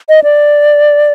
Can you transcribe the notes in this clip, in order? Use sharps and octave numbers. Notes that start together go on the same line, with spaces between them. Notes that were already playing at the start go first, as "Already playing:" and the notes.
D#5
D5